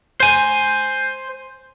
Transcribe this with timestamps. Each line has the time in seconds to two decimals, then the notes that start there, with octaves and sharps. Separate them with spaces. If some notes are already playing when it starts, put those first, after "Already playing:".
0.20 C5 G#5